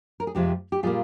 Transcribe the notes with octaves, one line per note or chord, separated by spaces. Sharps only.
A#4
G#4
F2 C3 F3 G#3 C4 G4
G4
A#2 G3 A#3 F4 G#4